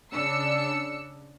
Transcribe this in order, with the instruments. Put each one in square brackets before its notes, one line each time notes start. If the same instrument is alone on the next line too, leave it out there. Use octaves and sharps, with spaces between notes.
[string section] C#3 D4 E6 C#7